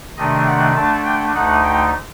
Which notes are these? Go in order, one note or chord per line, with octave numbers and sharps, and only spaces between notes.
C3 D#3 A3 D4 D#5
F#5
D3 A3 D4 A5
G5
D2 D3 A3 D#4 F#5
G5